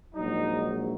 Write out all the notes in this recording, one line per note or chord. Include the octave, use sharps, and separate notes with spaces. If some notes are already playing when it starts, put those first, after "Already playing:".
A#1 G#2 F#3 D#4